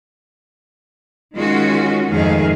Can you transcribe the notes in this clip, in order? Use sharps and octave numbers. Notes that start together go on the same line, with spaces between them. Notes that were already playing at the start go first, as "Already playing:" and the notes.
D#3 G#3 C#4 F4 F#4
F2 G#2 D#3 A3 G#4 F5